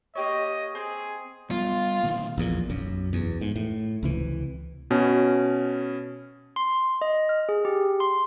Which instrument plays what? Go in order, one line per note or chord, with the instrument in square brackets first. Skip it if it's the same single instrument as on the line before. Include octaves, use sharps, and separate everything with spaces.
[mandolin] A#3 G4 C#5 [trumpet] D#5
[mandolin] C4 [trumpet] G#4
[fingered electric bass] G3 B3 [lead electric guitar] F4
[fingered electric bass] B2 D#3 A#3
A#1 E2 A#2
B1 F#2
E2
G#2
A2
C#2 C3 E3
[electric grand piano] B2 C#4
[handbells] C6
D#5
F6
G#4
G4
C6